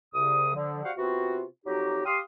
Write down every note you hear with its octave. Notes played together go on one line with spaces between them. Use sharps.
C2 C#3 D#6
D3 F3
G3 F#4 C5 F5 F#5
C3 B3 C4 F4 F#4
F2 F#3 D#4 F#4 G4
G4 F5 C6 D#6